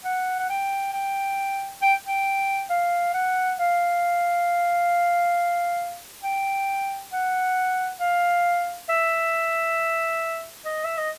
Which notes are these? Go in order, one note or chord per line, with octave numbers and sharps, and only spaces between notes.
F#5
F#5
G5
G5
G5
G5
F5
F#5
F5
G5
F#5
F5
E5
D#5
E5
D#5